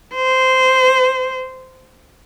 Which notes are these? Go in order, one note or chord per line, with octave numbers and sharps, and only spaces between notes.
C5